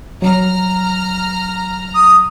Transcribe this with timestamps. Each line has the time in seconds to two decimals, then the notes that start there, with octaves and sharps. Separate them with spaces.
0.22 F#3 A#5 F6
1.94 D#6